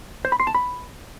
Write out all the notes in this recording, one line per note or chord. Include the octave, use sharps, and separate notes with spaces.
C5
B5
C6
A5
B5